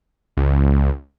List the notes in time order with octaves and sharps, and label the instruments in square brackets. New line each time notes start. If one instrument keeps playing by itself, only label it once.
[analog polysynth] C#2